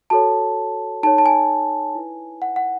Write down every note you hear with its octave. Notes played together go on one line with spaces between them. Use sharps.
F#4 A4 C#5 A5
D#4 A4 C#5 A5
A5
G#5
E4 B4
F#5
F#5